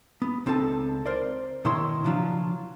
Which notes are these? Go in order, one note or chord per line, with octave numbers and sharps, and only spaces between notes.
B3
C#2 C4 D#4 A4 A5
A#4 C5 D5
B2 D#3 E4 C#5 C6
C#3 F3 F#3 D4 F4